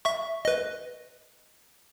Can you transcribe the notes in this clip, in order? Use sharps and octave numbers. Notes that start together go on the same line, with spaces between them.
E5 C#6
B4 D#5